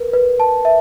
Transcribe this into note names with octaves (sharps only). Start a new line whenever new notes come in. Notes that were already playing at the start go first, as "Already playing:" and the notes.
Already playing: A#4 B4
B4
A5
E5